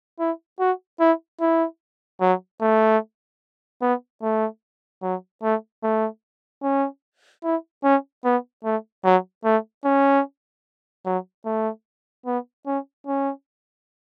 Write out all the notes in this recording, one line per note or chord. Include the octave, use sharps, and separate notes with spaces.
E4
F#4
E4
E4
F#3
A3
B3
A3
F#3
A3
A3
C#4
E4
C#4
B3
A3
F#3
A3
C#4
F#3
A3
B3
C#4
C#4